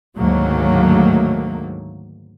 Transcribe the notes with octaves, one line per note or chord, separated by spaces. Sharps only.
D2 G#2 D#3 F#3 A3 A#3